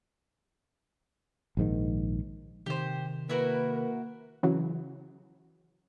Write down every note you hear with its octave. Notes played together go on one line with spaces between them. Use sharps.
A#1 G#2 D#3
C3 D#3 G4 C5
A#3 E4 F#4 A#4 B4
C#3 E3 F#3